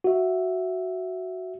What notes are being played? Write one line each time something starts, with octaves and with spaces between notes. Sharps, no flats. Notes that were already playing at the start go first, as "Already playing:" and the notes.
F#4 E5